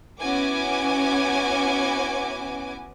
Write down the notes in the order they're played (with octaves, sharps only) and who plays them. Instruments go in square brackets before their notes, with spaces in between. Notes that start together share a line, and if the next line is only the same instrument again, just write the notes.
[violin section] B3 C#4 E4 F#4 G#5 D6